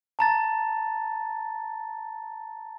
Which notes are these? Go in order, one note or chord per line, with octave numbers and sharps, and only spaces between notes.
A5 A#5 A6